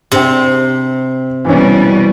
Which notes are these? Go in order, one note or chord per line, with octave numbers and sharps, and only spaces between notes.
C3 D4 C5 G5
B2 E3 G3 C#4